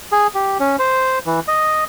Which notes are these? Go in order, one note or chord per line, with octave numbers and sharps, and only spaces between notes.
G#4
G4
C#4
C5
E3
D#5